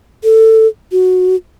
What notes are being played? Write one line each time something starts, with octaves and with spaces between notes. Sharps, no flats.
A4
F#4